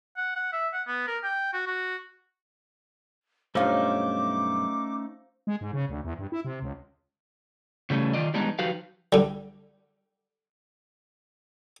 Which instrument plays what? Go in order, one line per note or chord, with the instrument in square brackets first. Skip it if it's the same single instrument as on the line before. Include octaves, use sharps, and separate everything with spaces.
[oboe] F#5
F#5
E5
F#5
B3
A#4
G5
F#4
F#4
[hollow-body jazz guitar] B1 G2 [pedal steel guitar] A3 C#4 D#4 [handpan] C5 F5 [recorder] D6
[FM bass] G#3
G#2
C#3
D2
E2
G2
E4
C3
C#2
[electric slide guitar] C#3 E3 G3 A3 C#4
D#3 F4 D5 D#5
E3 G3 G#3 B3 D4 D#4
F3 D#4 F#4 G4 B4 F5
[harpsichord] D3 G3